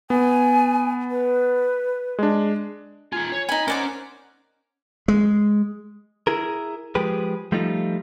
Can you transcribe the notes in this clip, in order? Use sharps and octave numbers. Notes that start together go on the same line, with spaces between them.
B3 G#5
B4
G#3 D4
D#4 F4 G#5
C#5
D#4 G#5 B5
C#4 D#4 A#4 C5 D5 F#5 D6
G#3
E4 G#4 A#4
F3 G#3 G4 G#4 B4
F3 G3 A3 D#4 F4